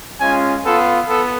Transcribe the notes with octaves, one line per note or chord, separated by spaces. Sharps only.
G#3 C#4 F4 G#5
B3 F4 A4
B3 A4